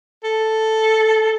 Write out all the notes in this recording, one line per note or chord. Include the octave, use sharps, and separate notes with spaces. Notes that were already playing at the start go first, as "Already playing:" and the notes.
A4